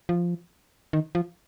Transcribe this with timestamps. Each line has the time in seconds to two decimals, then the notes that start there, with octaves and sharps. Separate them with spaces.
0.09 F3
0.93 D#3
1.15 F3